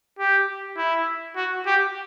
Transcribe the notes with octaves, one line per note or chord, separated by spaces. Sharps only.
G4
E4
F#4
G4